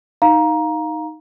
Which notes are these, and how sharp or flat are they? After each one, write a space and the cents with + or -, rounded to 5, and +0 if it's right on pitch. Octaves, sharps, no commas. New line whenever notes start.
D#4 +0 F5 +10 A#5 +15